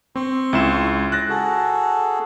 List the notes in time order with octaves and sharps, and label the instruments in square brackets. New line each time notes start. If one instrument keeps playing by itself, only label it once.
[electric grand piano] C4 [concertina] C6 C#6
[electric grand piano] C#2 E4 E7
F#6 A6 A#6
[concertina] F#4 G#4 A4